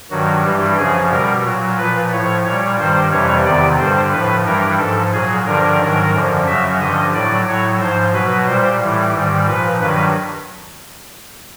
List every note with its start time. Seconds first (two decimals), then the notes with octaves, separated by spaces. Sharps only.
0.11 G2 D#3 F#3 F#4
0.44 G2 E3 G3 G4
0.77 F#2 C#3 F3 G#4
1.10 B2 G3 A#4
1.45 A#2 F#3
1.78 A#2 F3 B4
2.11 A2 F3 C#5
2.45 A#2 G3 C#5
2.78 G2 D#3 G3 C5
3.11 F2 C3 E3 G3 C#5
3.45 E2 C3 D#3 D5
3.78 G2 D3 G3 C5
4.12 A2 F3 B4
4.45 G2 E3 G3 A#4
4.78 G#2 F3 A4
5.13 A#2 F#3 G#4
5.46 G2 D3 F3 A#4
5.79 G#2 D#3 F#3
6.13 F#2 D3 F3
6.46 F#2 C#3 F#3 E5
6.79 G2 D3 F3 D#5
7.13 A2 F#3 D5
7.47 A2 F#3 C#5
7.79 G#2 F3 C5
8.13 B2 F#3 B4
8.46 A#2 G3 C5
8.81 A2 E3 G3
9.14 G#2 D#3 G3
9.47 A#2 F3 B4
9.80 G2 D#3 F#3 B4